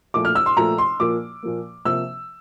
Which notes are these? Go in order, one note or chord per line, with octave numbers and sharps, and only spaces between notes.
A#2 F3 A3 D6
F6
E6
C6
A#2 F3 A3 A#5
C6
A#2 F3 A#3 D6
A#2 F3 A#3
C3 F3 A#3 E6